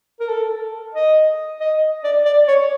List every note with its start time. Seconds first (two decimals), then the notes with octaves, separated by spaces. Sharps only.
0.20 A#4
0.29 A4
0.94 D#5
1.60 D#5
2.04 D5
2.25 D5
2.48 C#5